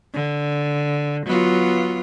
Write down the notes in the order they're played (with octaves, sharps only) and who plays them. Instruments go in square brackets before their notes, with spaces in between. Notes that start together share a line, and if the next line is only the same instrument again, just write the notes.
[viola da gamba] D3
F#3 B3 F4